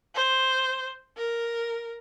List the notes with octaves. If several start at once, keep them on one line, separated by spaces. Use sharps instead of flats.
C5
A#4